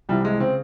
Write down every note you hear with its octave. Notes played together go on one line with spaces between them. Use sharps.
C2 C3 E3 G3
G#3
C#3 C4